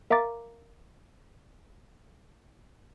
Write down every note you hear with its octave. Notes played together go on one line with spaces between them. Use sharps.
A#4 E5 F5 A#5 D6 A6